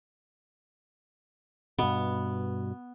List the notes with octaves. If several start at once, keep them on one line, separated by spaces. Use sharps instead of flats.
G2 B2 B3